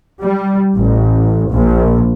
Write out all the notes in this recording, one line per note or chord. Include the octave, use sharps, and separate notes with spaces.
G3
A1
A#1